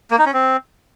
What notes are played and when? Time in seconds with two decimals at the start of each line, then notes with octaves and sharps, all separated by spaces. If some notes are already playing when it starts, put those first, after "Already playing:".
0.11 A#3
0.18 D#4
0.26 C#4
0.34 C4